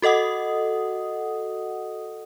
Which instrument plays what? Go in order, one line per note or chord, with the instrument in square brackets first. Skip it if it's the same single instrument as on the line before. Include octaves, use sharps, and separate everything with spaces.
[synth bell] F#4 A4 D#5 F#5 D#6